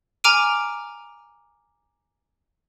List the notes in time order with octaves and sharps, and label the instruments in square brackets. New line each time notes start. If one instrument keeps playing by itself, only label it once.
[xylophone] G#5 A#5 D6 F6 D7 D#7